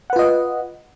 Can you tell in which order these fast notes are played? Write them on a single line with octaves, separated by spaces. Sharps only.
F#5 B4 F4 D#5